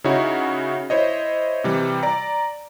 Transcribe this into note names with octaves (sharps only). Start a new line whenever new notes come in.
C#3 D#4 E4 F#4 C#5
E4 C5 C#5 D#5
C3 E3 G3
D5 A#5